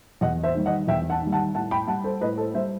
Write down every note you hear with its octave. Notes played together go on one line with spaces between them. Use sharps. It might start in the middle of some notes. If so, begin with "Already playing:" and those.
E2 D#5 F#5
C5 E5
D#3 G3
D#5 F#5
E2 E5 G5
F#5 A5
D#3 G3
F#5 A5
A2 F#5 A5
G5 B5
G3 F#5 A5
A4 C5
A2 B4 D#5
A4 C5
G3 C5 E5